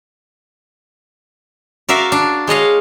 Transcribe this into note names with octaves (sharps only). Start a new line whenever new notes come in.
F#4 A#4 D5 E5 F5
D4
G#3 C#5 D#5 F5